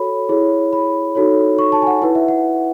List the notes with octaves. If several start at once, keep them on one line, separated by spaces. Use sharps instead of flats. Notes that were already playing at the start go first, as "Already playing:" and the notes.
Already playing: F#4 A4 C#5 B5
E4 G#4 C#5
B5
D#4 F#4 A4 C#5
C#6
A5
G#5
F#5
E4 B4 F#5
E5
F#5